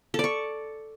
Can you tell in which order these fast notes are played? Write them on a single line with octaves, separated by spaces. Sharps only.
A4 D5 C#6